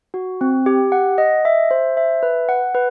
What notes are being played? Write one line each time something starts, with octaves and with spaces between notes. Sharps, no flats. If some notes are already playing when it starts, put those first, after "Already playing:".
F#4
C4
G4
F#5
D#5
E5
C5
E5
B4
F#5
B4